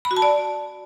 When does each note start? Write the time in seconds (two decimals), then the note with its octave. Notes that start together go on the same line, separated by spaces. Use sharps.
0.05 B5
0.11 F#4
0.17 A5
0.22 D5